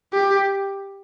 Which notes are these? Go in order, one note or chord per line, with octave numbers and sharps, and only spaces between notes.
G4